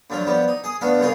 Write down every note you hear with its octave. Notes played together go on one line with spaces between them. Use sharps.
D2 F3 F#3 F4
F3 G3 B3
D#4
G#4 D#6
A3 B3 D4 F5
C2 C#3 D#4 F4 G#4